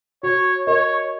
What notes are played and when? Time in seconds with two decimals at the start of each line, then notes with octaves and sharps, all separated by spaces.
0.23 F#4 C#5
0.67 A#4 C#5 D#5